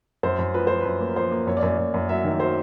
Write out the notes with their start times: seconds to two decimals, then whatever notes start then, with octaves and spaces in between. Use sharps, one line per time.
0.23 F#2 C5
0.39 F#2
0.54 F3 B4
0.67 F3 C5
0.80 B4
0.85 F#2
1.01 A#3
1.16 F3 C5
1.32 A#3
1.47 F#2 C#5
1.57 D5
1.62 F#2
1.68 D5
1.78 F#2
1.94 F#2
2.09 F#3 E5
2.25 D#3
2.40 F#3 C5